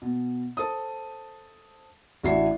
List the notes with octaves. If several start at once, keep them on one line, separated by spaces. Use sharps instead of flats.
B2
A4 C5 D#6
A1 D4 E4 F#4 E5 C7